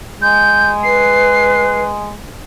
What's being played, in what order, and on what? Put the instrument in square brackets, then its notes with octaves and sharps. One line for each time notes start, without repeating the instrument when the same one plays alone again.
[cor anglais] G#3 [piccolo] G6
[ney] B4 [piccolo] C7